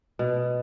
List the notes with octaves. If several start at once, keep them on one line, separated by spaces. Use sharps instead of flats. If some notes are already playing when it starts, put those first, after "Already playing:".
B2